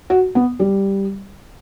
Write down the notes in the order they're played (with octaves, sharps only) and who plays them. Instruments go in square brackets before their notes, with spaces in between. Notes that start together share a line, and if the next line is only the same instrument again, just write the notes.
[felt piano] F#4
B3
G3